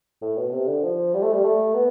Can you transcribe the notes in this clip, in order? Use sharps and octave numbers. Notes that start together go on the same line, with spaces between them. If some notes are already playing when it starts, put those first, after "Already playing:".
A2
B2
C3
D3
F3
G3
A3
G3
A3
B3